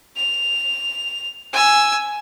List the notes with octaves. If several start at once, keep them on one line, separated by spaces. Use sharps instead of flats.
F7
G#5 E6